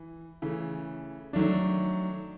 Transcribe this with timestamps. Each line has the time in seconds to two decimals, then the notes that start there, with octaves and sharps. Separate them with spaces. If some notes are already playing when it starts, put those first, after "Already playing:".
Already playing: E3
0.42 C#3 E3 A3
1.33 D#3 F#3 A3 D4